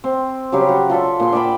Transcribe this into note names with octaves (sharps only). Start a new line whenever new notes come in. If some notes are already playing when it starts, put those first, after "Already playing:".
C4
C#3 F#3 G3 G4
F#4
F4 A4 D5 E5
A#2 G#4 C6
D5 E5 G5 B5